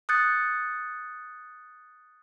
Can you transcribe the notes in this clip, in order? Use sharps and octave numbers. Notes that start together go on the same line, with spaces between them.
D#6 F#6 G6 A6 C#7